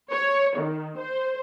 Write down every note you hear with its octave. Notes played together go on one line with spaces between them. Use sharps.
C#5
D#3
C5